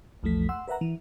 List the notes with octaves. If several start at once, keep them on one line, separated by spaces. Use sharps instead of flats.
A#1 E2 F3 A3 B6
F#5 C6 E6
A#4 B4 E5 F#5 A#5
E3